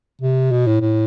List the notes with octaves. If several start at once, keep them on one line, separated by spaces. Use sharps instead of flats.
C3
B2
A2
A2